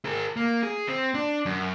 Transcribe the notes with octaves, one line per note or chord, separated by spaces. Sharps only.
G#4 A#4
A#3
G#4
C4
D4
F#2